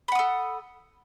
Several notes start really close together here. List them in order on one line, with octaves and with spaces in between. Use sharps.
B5 F#5 D#6 A4